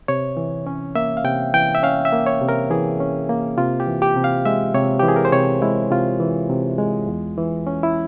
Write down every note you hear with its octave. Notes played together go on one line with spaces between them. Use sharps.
C3 C#5
E3
C#4
A#3 E5
F5
C3 G5
E3 G5
E5
C#4 F5
E5
A#3
C#5
C3
A#4
E3 G#4
C#4
A#3
C3 F4
G4
E3
G4
C3
F5
G#3 E5
C3 C#5
G4
E3
G#4
A#4
C5
C3 C#5
G#3 E4
C3 F4
E3
C3
G#3
E2
E3
C#4
E4